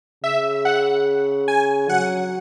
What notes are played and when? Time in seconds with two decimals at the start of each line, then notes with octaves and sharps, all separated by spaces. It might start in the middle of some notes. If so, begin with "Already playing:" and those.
0.24 C#3 E5
0.65 F#5
1.48 G#5
1.89 F#3 F#5